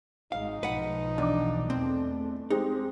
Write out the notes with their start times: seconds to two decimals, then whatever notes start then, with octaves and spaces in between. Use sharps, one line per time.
0.32 G#1 G#2 G#3 D#4 F5
0.63 B1 F3 B4 F#5
1.18 E2 D4 D6
1.70 E2 A3 C4
2.50 G#3 C4 D#4 G4